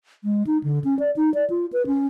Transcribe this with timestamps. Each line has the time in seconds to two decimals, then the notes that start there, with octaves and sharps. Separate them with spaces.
0.24 G#3
0.47 D#4
0.64 D3
0.84 C#4
0.99 D5
1.16 D#4
1.34 D5
1.50 F4
1.73 B4
1.87 C#4